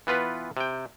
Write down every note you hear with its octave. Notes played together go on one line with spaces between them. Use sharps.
E3 B3 F4 B4
C3 G5